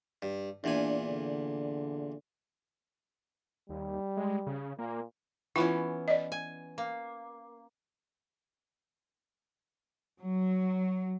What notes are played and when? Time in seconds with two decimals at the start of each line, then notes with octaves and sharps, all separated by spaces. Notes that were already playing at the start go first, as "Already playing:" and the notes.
0.22 G2
0.64 E2 A#2 D4 G#5
1.08 D3
3.69 D#2 G3
4.17 G#3
4.47 C#3
4.79 A#2 A#3
5.56 E3 B3 C#4 E4 F4
6.08 D5 D#5
6.32 G#5
6.78 A#3
10.20 F#3